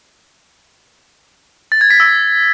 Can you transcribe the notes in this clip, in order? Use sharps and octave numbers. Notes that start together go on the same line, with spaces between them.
A6
G#6
B6
E6